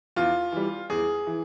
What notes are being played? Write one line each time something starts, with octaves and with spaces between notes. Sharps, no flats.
E2 F4
E3 G3
E2 G#4
E3